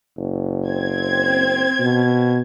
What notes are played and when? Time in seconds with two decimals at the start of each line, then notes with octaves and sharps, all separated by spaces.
0.17 F#1
0.68 C4 G#6
1.80 B2